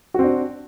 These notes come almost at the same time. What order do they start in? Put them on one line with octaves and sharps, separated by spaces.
F#4 C4 D4